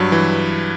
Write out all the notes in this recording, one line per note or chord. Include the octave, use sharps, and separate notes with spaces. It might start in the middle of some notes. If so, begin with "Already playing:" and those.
Already playing: G2 F#3
E3